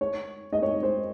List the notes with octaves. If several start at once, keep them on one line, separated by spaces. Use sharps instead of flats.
C#5
D#5
C#5
C5